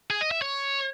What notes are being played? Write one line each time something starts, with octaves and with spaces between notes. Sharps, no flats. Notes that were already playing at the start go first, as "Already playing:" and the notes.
G#4
D#5
E5
C#5